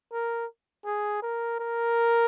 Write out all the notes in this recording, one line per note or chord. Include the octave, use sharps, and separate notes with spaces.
A#4
G#4
A#4
A#4